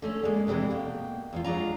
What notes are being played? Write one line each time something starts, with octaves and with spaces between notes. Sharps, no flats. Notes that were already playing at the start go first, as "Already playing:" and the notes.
D3 A3 C#4
G#3 A#3 D5
E2 C3 E3 G#3 D4
B2 A#3 G5
E2 E4 F4
F#3 G#3 D4 F4 A#5